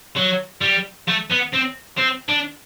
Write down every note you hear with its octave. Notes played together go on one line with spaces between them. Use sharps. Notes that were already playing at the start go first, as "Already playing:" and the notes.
F#3
G3
A3
B3
C4
C4
D4